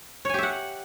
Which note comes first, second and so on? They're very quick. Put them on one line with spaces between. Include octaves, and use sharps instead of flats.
C#5 G#5 G4 E5 F#5